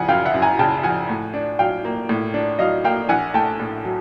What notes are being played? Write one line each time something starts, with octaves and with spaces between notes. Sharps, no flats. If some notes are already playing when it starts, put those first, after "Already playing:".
Already playing: C#3 F3 F#5 G#5
F#2 F5 G5
E5 F#5
F#2
G#5 A#5
C#3 G5 A5
F3 F#5 G#5
A2
D4
F#3 F5 G5
A#3
A2
D4
F#3 D#5 F5
A#3 F5 G5
A#1 F#5 G#5
A3 G5 A5
A2
F#3